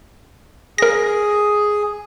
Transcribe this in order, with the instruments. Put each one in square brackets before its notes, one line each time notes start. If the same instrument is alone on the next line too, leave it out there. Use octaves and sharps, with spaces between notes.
[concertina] G#4 [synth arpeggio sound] A#4 A#6